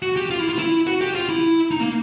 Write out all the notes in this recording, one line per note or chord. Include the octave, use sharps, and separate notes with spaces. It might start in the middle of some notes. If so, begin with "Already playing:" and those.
F#4
G4
F4
E4
F4
E4
F#4
G4
F4
E4
D#4
A#3